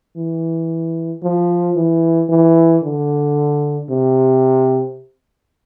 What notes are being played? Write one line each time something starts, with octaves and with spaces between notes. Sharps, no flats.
E3
F3
E3
E3
D3
C3